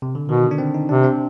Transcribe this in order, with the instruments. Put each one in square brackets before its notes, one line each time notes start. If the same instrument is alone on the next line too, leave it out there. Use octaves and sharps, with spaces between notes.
[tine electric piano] C3
D3
[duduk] B2 [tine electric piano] D#3
[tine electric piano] D3
D4
C4
D#4
[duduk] C3 [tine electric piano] D4
[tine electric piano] C4